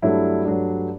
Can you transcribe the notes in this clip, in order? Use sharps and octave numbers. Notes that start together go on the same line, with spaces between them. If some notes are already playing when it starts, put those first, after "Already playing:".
G2 F#3 A3 D4 E4
G2 F#3 A3 D4